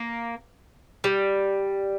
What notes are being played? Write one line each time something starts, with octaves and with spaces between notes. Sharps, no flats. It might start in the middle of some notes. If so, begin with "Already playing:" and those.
Already playing: A#3
G3